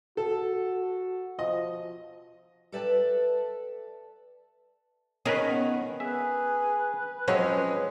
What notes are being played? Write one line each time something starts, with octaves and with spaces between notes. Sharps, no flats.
F#4 A4
F3 D#5
A4 B4 D5 E5 G5 A5
D#3 C#4 G#4 A#4 B4
B3
G#4 B4 E5
F3 F#3 G#3 C4 C#4 C#5